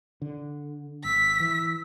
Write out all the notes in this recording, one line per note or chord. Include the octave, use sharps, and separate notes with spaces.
D3
G#1 E6 B6
E3